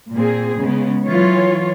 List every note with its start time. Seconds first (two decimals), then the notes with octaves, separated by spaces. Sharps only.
0.13 A#2 A#3 C4 G#4
0.60 C#3 G#3 B3
1.07 E3 F#3 F4 C#5